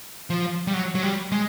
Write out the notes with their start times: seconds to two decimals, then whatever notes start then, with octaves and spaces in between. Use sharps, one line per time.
0.30 F3
0.67 G3
0.74 F#3
0.95 F#3
1.03 G3
1.32 G#3